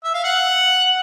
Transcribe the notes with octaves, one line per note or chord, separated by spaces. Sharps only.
E5
F5
F#5